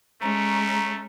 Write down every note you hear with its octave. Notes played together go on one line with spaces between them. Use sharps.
G#3 A3 C#4 A#5